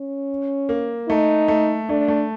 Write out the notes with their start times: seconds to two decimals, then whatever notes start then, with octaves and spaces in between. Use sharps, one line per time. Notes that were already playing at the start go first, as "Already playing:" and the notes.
Already playing: C#4
0.69 A#3
1.09 A3 D#4
1.48 A3
1.89 A3 D4
2.08 A3